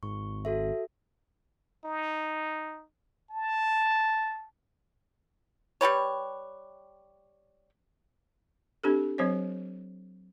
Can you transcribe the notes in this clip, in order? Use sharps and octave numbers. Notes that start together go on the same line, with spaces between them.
G#1 C#6
F#4 A4 E5
D#4
A5
G3 G4 B4 C#5
C4 D4 G4 A4
F#3 C4 C5 C#5